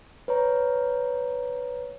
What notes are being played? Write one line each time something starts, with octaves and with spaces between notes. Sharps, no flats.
B4 C#5 A#5